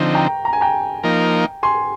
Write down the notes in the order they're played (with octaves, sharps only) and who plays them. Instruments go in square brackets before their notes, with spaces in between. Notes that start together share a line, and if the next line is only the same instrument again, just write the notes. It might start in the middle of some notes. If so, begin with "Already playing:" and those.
Already playing: [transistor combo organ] D3 F3 C4 D#4
[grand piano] G5 A#5
A#5
G#5
G5 A#5
[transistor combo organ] F3 A#3 D#4 A#4
[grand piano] G#5 C6